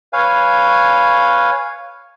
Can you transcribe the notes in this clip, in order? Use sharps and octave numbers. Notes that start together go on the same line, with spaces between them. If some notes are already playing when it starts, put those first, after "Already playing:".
B4 C#5 F5 G#5